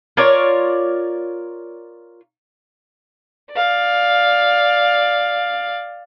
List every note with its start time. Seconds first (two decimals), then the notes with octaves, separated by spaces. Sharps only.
0.17 F4 A#4 C#5 D5
3.53 D5 F5